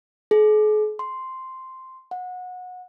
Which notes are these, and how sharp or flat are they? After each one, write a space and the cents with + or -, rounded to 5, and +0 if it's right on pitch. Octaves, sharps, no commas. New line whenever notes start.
G#4 +45
C6 -5
F#5 -25